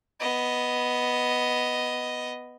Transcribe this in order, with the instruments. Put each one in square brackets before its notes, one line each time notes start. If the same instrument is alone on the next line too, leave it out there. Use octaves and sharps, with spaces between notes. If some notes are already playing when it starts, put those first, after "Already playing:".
[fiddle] B3 D#5